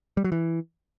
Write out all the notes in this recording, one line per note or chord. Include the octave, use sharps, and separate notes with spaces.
G3
F#3
E3